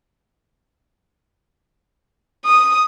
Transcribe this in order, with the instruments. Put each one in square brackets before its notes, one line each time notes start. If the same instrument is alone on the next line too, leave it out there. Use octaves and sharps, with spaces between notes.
[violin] D#6